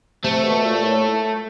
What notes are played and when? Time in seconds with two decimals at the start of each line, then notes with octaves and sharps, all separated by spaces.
0.24 C3 A3
0.44 B2
0.63 A#2
0.84 A2